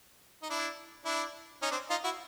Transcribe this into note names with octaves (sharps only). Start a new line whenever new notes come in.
D#4
D4 E4
D4 E4
C#4 D#4
C4 D4
D#4 F4
E4 F#4